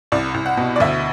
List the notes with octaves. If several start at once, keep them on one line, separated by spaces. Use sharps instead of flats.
C2 D5
C2
F#5
B2
D5
D2 E5